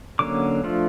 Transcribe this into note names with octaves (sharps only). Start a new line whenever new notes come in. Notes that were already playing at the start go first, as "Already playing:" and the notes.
D3 F#3 A#3 C#4 D6
F3 A3 D4 F4